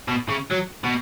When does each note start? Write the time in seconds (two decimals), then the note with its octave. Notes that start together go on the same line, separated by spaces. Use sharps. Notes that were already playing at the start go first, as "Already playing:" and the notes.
0.08 B2
0.29 C#3
0.51 F#3
0.84 B2